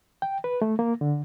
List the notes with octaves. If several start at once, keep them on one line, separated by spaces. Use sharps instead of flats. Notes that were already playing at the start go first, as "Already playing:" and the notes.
G5
B4
A3
A#3
D3